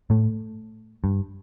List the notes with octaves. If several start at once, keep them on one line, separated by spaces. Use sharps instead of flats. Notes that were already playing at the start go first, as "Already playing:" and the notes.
A2 A3
G2